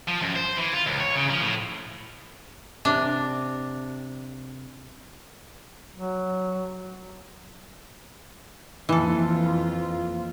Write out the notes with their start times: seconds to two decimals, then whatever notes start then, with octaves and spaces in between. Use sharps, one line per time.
0.08 F3
0.22 F#2
0.36 C5
0.58 E3
0.74 F4
0.87 C#2
1.00 C#5
1.15 C#3
1.30 F3
1.42 A2
2.85 C3 D4
5.95 F#3
8.89 F2 E3 A#3 F4 A4 E6